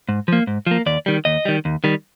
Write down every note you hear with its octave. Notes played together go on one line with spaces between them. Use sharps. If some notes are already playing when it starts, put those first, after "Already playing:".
G#2
F3 A#3
G#2
F3 A#3
D#2 D5
D#3 G3
D#2 D#5
D#3 G3
D#2
D#3 G3